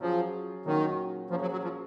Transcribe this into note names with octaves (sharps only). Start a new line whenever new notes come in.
F3 F#3 C#4 G#4
A#2 D#3 F#3 C#4 F#4
F3 A#3 C#4 G#4
F#3
F#3
F3